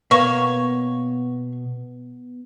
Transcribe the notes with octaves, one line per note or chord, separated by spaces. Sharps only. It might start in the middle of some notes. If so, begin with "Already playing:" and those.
B2 A#3 B3 C#5 C#6